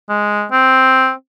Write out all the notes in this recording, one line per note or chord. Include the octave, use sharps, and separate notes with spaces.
G#3
C4